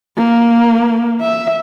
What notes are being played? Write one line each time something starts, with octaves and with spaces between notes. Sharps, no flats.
A#3
E5